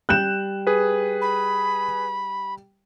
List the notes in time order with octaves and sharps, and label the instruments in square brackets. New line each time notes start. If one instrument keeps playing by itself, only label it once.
[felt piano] G3 G5 [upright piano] F#6 G6 E7
[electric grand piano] G#4 B4
[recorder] B5